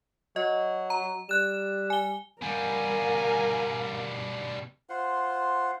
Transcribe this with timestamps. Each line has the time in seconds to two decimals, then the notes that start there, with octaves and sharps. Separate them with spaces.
0.36 F#3 D#5
0.90 A#5
1.29 G3 F#6 E7
1.90 G#5 G7
2.42 B2 G3 A#4 F5 G#5
4.90 F4 C5 F#5 C6